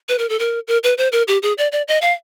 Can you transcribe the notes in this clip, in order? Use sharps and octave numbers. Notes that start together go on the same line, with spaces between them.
B4
A#4
A4
A#4
A#4
B4
C5
A#4
G4
G#4
D5
D5
D#5
F5